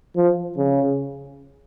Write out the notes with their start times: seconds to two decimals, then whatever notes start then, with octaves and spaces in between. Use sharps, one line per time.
0.16 F3
0.57 C#3